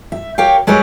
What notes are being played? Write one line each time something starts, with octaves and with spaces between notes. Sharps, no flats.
E5
G4 A#4 C#5 F5 G5
F#3 G#3 G4 A#4 B4 C#5